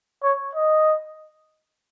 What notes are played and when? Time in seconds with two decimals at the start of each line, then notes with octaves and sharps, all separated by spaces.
0.23 C#5
0.55 D#5